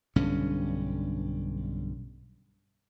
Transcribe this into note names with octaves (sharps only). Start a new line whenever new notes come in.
B1 G2 D3 C#4